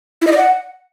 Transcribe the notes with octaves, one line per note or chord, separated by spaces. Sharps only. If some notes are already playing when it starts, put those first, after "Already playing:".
E4
D#5
D5
F#5